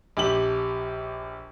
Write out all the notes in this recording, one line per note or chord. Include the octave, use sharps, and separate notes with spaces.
A#1 G4 F#7